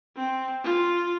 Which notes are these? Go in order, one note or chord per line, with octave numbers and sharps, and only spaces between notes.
C4
F4